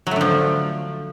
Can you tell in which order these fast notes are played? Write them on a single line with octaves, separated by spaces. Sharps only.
F#3 A3 D3 F3